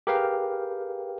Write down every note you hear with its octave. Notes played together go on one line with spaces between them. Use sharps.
G4 G#4 A#4 B4 F5 G5